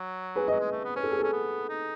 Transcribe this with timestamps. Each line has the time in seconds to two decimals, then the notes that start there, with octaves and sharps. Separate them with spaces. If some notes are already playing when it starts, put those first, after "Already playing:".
Already playing: F#3
0.36 G#4 B4
0.48 F#3 B4 D#5
0.60 G#3
0.72 A3
0.84 B3
0.96 C#4 B4
1.03 A4
1.11 G#4
1.19 C#4 A4
1.32 B3
1.69 D#4